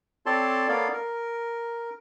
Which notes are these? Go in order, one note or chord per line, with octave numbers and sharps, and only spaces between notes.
C4 A4 C#5 D5 A5 C6
A#3 B3 A4 C#5 D5 F5
A#4